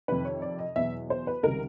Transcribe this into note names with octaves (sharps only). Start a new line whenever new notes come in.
F2 C3 D#3 B4
C#5
D5
D#5
E2 B2 F#3 B3 E5
C5
B4
C#2 C3 D#3 G3 A#4